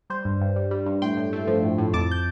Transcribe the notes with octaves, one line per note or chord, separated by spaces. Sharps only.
G3 C5
G2
G2
G3
G3
G2
A2 G5 C6
A2
A3
F3
A2
A2
F2 A5 D6
G6